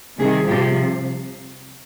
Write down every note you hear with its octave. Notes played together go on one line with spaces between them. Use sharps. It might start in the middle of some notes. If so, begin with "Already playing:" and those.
C3 D#3 G3 G#4
C3 F3 G4